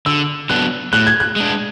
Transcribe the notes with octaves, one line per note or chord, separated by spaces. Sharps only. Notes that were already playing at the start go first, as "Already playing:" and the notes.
D3 E6
F#3 B3 D4 F#6
A2 F#6
G#6
F#6
G#3 D4